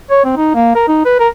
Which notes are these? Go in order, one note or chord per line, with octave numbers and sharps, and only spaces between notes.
C#5
C4
D#4
A#3
A#4
D#4
B4
A#4